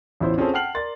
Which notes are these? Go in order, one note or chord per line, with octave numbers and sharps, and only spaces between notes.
A1 E2 E4 F4 C5
C4 C#4 F4 G#4 A4 C5
F#5 G5 A5 F6 C7 F#7
A#4 D5 C6 A6